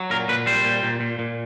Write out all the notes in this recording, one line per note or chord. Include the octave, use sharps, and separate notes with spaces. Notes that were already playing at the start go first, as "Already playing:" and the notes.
Already playing: F#3
A#2 A#4
A#2 B4
G3 C5
A#2
A#2
A#2
A#2